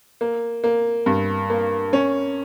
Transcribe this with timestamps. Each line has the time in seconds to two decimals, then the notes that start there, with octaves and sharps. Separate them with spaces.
0.21 A#3
0.64 A#3
1.06 G2
1.50 A#3
1.93 C#4